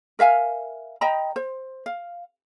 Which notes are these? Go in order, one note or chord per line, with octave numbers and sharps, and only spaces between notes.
A#4 E5 F5 G#5
D#5 G5 A#5 B5
C5
F5